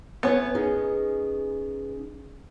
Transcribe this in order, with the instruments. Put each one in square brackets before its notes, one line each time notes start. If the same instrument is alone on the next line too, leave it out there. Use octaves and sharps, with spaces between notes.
[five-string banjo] B3 C#5 [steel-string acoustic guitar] B4 E5 G#5
[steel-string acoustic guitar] C#4 D#4 G#4